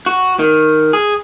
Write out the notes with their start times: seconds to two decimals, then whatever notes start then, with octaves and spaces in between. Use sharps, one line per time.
0.06 F#4
0.39 D#3
0.93 G#4